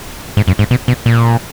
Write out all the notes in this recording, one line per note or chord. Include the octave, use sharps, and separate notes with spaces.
G#2
F#2
G#2
B2
B2
A#2